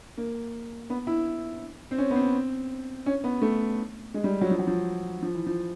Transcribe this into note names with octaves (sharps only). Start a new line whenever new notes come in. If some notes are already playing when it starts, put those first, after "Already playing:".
A#3
B3
E4
C4
C#4
B3
C4
C#4
B3
A3
G#3
G3
F#3
F3
F#3
F3
F3
E3
F3